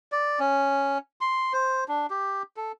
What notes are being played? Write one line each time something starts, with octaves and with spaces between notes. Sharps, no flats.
D5
C#4
C6
C5
D4
G4
A4